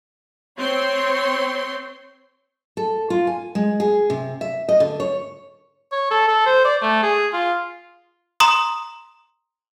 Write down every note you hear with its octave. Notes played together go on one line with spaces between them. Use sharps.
C4 C#5 C6
A4
F4
G#5
G#3
G#4
C3
E5
D#5
D3
C#5
C#5
A4
A4
C5
D5
A3
G#4
F4
A#5 C6 D#6